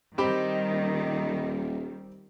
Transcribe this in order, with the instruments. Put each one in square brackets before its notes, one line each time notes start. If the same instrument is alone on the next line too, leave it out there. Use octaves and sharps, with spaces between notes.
[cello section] D#3 G3 [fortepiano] C4 G4 B5 [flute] D#5
[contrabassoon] D#1